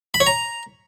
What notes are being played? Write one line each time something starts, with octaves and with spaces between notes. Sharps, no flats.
B5
C#5
A#5